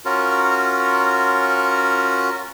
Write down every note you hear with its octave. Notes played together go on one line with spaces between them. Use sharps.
C#4 F4 F#4 A#4